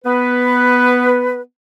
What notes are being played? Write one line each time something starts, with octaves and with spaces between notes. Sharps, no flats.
B3 B4